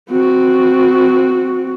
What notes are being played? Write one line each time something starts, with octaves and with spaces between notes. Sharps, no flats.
C4 F#4